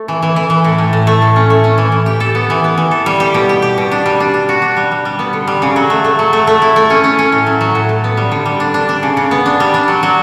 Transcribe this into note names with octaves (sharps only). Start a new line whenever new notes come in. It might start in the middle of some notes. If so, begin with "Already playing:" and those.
Already playing: A3
E3
E3
E3
E3
A2
A2
A2
A3
A2
C#4
A3
C#4
E3
E3
G4
A4
B3
E3
B3
E3
A4
G3
G4
B2
G4
G4
B2
D4
G3
D4
D4
F#4
D4
G3
G3
G3
B3
D3
G3
C#3
F#3
A3
A3
F#3
A3
A3
E4
A3
C#4
C#4
C#4
A2
F#3
F#3
A2
A2
B3
G3
D3
G3
D4
D4
D4
C#3
C#3
B3
D4
G3
D4
F#3
F#3